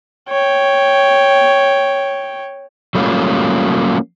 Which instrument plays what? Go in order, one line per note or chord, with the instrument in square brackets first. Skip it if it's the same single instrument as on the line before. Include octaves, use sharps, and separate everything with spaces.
[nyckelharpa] C#5 G5
[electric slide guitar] F#3 G3 A3 A#3 C#4 F4